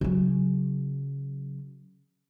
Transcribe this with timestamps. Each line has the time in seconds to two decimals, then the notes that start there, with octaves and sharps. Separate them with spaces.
0.01 C#3 F#3